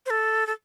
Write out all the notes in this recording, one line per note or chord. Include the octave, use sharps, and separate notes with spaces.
C5
A4
A4